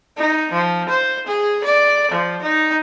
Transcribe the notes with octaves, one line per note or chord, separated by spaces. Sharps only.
D#4
F3
C5
G#4
D5
F3
D#4